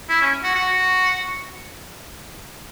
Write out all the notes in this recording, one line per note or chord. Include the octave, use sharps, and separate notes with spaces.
E4
C#4
F#4
F#4